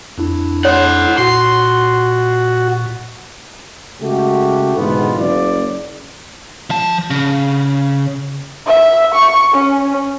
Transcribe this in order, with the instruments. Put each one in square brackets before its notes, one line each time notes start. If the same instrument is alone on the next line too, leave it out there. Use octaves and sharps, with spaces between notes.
[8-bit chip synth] F2 D4 E4
[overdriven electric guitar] C5 F#5 [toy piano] C#5
[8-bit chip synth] A#2 [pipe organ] F#4 [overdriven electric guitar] C6
[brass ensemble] C#3 G#3 A3 F#4 G4
G#2 B2 D3 E3 B3 F4
F#1 C#3 D5
[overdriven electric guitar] F3 A5
C#3
[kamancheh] E5
C#6
C#4